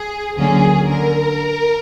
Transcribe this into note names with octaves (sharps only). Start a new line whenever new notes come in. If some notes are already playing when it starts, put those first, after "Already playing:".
Already playing: G#4
D2 D3 F#3 A#3 C#4 G#4
D3 A#4